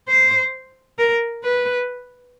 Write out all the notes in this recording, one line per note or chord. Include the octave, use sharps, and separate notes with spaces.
C5
A#4
B4